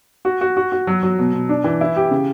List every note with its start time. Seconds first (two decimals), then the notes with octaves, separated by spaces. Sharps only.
0.25 F#4
0.41 F#4
0.57 F#4
0.72 F#4
0.87 F#3
1.03 F#3
1.19 B2
1.33 B2
1.49 D4
1.64 E3
1.81 E4
1.96 G4
2.11 C#3